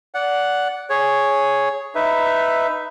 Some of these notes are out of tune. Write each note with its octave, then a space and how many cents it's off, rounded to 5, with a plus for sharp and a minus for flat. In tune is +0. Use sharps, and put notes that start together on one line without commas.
D5 -20 F#5 +0
G#4 +0 C#5 +0
D#4 +0 B4 +10 E5 +0